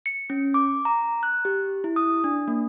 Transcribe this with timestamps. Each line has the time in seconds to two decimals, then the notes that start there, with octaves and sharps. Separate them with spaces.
0.06 C#7
0.30 C#4
0.54 D6
0.85 A#5
1.23 F#6
1.45 G4
1.84 E4
1.96 D#6
2.24 D4
2.48 A#3